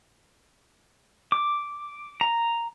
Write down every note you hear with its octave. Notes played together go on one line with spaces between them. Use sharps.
D6
A#5